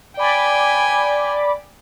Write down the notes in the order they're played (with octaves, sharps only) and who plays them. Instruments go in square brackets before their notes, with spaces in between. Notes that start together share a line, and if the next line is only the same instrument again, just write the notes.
[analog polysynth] D5 B5 D6 [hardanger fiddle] G5 G#5